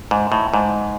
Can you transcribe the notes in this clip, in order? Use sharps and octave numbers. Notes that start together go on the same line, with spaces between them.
G#2
A2
G#2